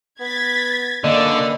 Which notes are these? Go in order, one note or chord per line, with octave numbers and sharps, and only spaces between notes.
B3 G#6 A6 B6
F#2 D3 A#3 B4 D5 D#5